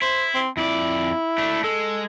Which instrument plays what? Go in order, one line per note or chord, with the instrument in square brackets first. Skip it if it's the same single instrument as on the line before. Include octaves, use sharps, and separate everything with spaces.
[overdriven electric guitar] E4 [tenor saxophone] C5
[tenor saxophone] C4
[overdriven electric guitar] F2 D5 [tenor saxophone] E4
[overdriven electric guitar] A3 D4
[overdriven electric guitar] G#3 [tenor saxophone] A4